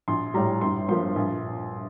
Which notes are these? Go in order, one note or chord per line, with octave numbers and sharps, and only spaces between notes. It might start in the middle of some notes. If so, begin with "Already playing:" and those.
A#1 C6
A2 G3 A#5
G1 C6
G2 F3 A#3 C6
A#1